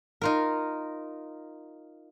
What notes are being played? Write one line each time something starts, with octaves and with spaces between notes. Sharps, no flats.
D#4 F4 A#4